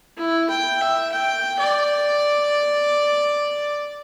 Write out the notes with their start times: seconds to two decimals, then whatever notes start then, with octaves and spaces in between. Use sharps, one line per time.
0.17 E4
0.49 G5
0.81 E5
1.12 G5
1.59 D5